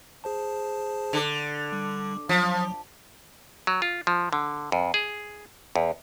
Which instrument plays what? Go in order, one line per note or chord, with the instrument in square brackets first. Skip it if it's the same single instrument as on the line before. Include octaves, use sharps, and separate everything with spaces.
[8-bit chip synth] G#4 C5 A5
[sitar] D3
[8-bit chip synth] G3
[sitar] F3 [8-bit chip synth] F#3
[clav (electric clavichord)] F#3
F4
F3
D3
F2
G#4
E2